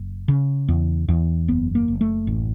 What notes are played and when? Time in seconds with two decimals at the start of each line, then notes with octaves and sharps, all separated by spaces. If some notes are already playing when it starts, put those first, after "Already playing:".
Already playing: F#1
0.28 C#3
0.68 E2
1.08 E2
1.48 F#1 B3
1.75 A#3
1.88 F#1
2.01 A3
2.27 A1